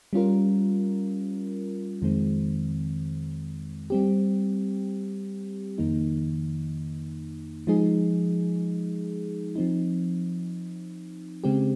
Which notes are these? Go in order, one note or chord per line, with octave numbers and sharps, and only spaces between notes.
G3 C#4 F4 A#4
F2 D#3 G#3 C4
G3 C4 G4
F2 D#3 A#3 D#4
F3 G#3 D#4 G#4
F3 C4 D#4
C#3 G#3 C4 G4